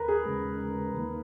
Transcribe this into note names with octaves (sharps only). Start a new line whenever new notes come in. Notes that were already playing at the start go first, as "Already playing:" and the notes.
Already playing: D#2 A#4 B4
G#4
D#2 C#3 G#3
D#2 D#3 A#3